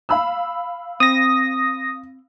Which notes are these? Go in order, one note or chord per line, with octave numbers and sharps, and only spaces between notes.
F5 B5 E6
C4 D#6 A#6